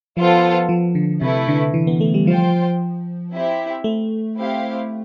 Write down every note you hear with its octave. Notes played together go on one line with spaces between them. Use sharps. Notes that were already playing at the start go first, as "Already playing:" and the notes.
F3 B3 F4 A4 C5
F3
D3
C3 A3 E4 B4
D3
E3
B3
A3
G3
F3 F4 C5 G5
C4 E4 G4 C5 E5
A3
C4 E4 G4 C5 F5